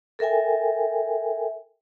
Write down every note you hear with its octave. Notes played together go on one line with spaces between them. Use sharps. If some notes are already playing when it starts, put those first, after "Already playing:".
A4 A#4 E5 G5 G#5